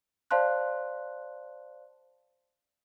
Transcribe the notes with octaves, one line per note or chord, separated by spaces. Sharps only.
C5 D5 F5 A5 C6 F#6